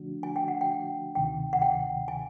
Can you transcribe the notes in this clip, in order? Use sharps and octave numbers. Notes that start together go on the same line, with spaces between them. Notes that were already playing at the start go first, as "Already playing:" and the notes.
Already playing: D3 F3 A3 D4 F#4
G#5
G5
F#5
G5
D2 C3 D#3 G5
F#5
G5
G#5